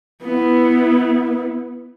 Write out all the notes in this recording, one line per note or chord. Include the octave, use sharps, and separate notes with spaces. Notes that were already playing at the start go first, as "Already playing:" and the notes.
B3 E4